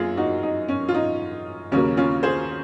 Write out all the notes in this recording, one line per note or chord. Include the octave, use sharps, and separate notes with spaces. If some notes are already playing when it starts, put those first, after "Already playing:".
Already playing: F#2 A#3 F4 G#4
D#4 F#4
D#4
C#4
F4
D#4
D#2 C#3 F#3 A#3 C#4
C#4 F4
G#4 C5